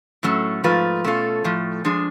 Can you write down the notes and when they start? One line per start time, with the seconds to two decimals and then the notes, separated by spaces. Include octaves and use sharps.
0.23 A2 F#3 A3 C#4
0.64 G#2 F3 A3 F4 B4
1.04 B2 A3 C#4 F4 A4
1.44 A2 F3 A3
1.84 F3 G#3 D4 G#4